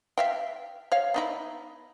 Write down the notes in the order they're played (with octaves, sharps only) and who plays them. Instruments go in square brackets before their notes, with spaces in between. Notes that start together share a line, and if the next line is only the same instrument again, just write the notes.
[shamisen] E5 F5 G5
C#5 F5
B3 D#4 E4